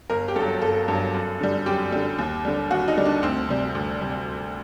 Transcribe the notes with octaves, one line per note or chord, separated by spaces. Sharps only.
G1 A#4
G4
G2 F#3 A4
G1 A4
G2 F#3
F#2
D3 G3
F#2 G4
D3 G3
D#2
D3 G3
D#2 F#4
D#4
D3 G3
D4
D2 C4
C3 G3
D2
C3 G3